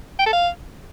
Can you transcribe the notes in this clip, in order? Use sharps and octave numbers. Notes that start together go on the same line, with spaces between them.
G5
A4
F5